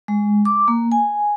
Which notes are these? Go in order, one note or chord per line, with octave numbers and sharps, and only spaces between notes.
G#3
D6
A#3
G#5